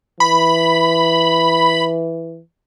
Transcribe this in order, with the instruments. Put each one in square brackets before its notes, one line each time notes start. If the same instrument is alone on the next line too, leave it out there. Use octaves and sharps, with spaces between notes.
[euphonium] E3 [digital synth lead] B5